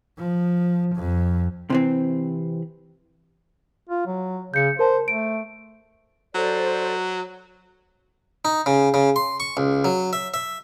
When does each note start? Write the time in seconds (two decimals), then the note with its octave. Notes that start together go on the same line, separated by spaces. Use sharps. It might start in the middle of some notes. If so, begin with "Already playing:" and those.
0.19 F3
0.96 F2
1.70 C3 E3 C4
3.89 F4
4.07 F#3
4.54 C#3 G6 C#7
4.79 A#4 C5 A5
5.08 A3 D7
6.35 F#3 A4 C5 D5
8.45 D#4
8.66 C#3
8.94 C#3
9.16 C6
9.40 C#6
9.57 C#2
9.85 F#3
10.13 E5
10.34 E5